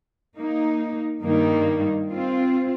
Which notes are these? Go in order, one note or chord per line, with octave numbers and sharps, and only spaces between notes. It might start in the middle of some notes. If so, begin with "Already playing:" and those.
A#3 D#4
G2 D#3 G3 A#3 D#4
C4 F4